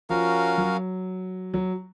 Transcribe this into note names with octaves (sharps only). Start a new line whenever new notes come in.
F3 C#4 F#4 A#4 F5
F#3
F#3